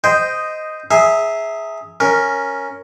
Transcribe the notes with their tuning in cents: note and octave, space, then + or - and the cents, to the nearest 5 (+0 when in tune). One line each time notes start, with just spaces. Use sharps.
C5 -15 D#5 +0 G5 +0
G#4 +5 E5 -10 A#5 -30
C#4 +0 A#4 +0